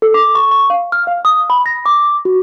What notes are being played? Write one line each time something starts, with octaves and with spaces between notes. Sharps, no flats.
A4
D6
C#6
C#6
F5
F6
F5
D#6
B5
A#6
D6
F#4